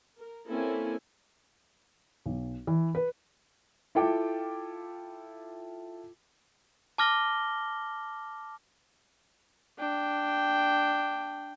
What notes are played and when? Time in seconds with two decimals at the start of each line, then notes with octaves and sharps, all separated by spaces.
0.17 A#4
0.48 A#3 C4 C#4 E4 A4 G#5
2.26 B1
2.67 E3
2.95 B4
3.95 E4 F4 A4 G5 D6
6.98 A5 D6 F6 A#6 G7
9.79 D4 G5